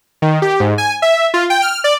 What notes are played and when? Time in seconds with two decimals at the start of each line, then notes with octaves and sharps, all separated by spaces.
0.22 D#3
0.42 G4
0.60 G#2
0.78 G#5
1.02 E5
1.34 F4
1.50 G5
1.62 F6
1.84 D5